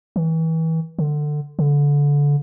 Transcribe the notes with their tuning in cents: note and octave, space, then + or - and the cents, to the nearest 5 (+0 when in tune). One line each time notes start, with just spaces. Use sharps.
E3 -30
D3 +20
D3 -25